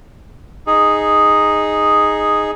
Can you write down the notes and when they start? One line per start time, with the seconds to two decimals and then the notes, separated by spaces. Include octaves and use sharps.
0.67 D#4 G#4